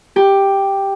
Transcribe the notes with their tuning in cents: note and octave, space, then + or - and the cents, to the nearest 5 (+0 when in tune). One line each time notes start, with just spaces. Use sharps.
G4 +5